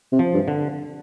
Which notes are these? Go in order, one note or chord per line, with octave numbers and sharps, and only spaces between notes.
C3
F3
G2
D3